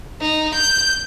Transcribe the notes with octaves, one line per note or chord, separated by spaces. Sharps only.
D#4
G6